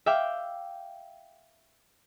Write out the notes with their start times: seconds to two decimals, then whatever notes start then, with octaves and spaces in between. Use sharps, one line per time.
0.06 E5 F5 G5 D6